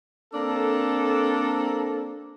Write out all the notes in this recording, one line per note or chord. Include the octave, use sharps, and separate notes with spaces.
A#3 C4 D4 A4